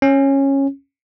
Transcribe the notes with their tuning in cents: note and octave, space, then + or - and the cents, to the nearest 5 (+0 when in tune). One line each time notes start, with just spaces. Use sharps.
C#4 -15